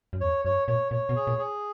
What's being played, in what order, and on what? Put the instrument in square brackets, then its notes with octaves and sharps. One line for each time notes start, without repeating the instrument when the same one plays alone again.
[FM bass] F#2
[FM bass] E2 [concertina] C#5
[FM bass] F#2 [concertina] C#5
[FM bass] A#2 [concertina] C#5
[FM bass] A#2 [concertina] C#5
[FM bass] B2
[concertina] G#4
[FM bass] A#2
[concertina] G#4